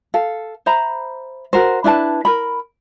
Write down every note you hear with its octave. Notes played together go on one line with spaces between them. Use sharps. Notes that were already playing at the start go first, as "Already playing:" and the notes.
A4 F5
C5 E5 A#5 B5
F#4 A#4 C5
D4 E4 B4 A5
A#4 B5